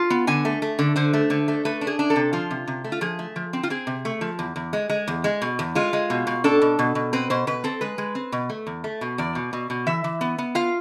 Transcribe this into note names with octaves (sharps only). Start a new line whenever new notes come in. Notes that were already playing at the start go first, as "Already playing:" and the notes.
Already playing: F4 A5
B3
D3 G#5
A3
A3
D3
D3 C5
A3
D3
A3
A3 B4
D4
G#4
D4
A4
C3
F3 F4
C3
C3
A3
F4
F3 G#4
A3
F3
C4
F4
C4 G#4
C3
A3
F3
E2
E2
G#3
G#3
E2
G#3
B2
E2
G#3 F4
G#3
B2
B2
D4 A4
B2
B2
B2
C4 B4
B2 C5
B2 B4
C4 A4
G#3 B4
G#3
C4
B2
A3
E2
A3
B2
E2 D5
B2
B2
B2
E3 E5
E3
B3
B3
F4 F5